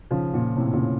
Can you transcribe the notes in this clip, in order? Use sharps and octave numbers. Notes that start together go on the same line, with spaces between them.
C#3 F3
A#2
A2 C3
A#2 C#3